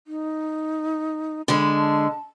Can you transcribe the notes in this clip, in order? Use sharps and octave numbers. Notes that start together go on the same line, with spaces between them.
D#4
D3 G#3 B5
A5